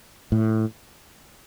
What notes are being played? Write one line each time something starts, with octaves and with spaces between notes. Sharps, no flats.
A2